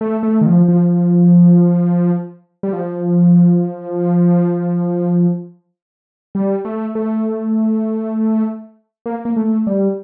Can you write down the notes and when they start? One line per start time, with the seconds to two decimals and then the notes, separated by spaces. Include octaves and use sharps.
0.01 A3
0.23 A3
0.41 D#3
0.46 F3
0.68 F3
2.63 G3
2.73 F3
6.35 G3
6.65 A3
6.95 A3
9.06 A#3
9.25 A#3
9.36 A3
9.67 G3